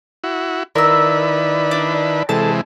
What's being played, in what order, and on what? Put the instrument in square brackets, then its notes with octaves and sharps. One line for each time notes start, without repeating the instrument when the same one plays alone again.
[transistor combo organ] E4 F#4
[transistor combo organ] D#3 E4 B4 [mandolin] A#4 E6 [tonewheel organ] D5
[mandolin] D4
[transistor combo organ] C3 E3 G#3 [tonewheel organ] A4 [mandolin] A5